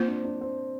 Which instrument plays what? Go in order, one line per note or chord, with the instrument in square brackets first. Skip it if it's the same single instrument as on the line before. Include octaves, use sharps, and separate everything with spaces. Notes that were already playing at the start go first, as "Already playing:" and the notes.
Already playing: [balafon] A#3 F4 C5 [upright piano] C4
[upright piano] D4
D4
C4